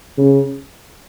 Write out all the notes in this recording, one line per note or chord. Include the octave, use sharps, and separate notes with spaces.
C#3